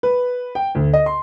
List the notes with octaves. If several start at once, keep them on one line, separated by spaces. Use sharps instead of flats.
B4
G5
D2
D#5
C6